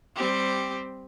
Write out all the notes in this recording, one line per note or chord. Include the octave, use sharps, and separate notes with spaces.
G3 C4 G4